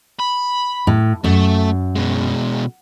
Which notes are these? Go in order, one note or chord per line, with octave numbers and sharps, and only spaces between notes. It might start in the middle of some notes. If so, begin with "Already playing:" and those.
B5
A2
F#2 A3
B2 G#3